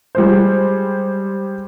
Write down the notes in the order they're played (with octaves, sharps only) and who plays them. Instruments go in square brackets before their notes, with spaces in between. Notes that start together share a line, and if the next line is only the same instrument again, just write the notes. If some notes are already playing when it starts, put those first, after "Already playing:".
[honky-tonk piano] G3 G#3 C5